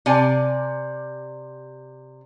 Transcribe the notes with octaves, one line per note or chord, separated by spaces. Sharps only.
C3 D5 G#5